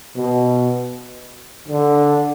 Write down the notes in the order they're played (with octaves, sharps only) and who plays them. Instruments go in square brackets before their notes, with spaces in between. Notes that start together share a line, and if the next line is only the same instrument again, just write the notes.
[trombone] B2
D3